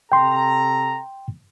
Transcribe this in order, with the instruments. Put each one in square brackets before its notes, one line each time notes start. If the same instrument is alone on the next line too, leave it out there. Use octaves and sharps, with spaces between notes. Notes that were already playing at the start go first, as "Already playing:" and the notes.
[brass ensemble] C3 A4 A#5 [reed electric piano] G5 C6